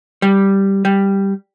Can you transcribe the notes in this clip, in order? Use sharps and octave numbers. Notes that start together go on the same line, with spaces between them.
G3
G3